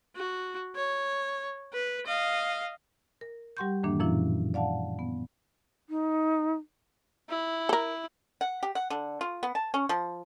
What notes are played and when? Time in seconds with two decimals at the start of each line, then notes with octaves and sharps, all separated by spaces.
0.16 F#4
0.76 C#5
1.73 B4
2.07 D#5 F5
3.21 A#4
3.57 G3 G4 F#5 C6 C#6 G6
3.83 F#2 A2 D#3 E3 A#3 D4
4.00 F#2 A#2 E3 F3 C#4 E4
4.54 D5 F5 F#5 A5
4.99 B3
5.89 D#4
7.29 E4
7.69 A4 A#4
8.41 F#5
8.63 G4
8.75 F#5
8.90 D3
9.21 F4
9.43 B3
9.55 A5
9.74 C#4
9.89 F3